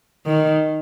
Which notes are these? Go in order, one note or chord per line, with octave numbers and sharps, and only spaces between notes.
D#3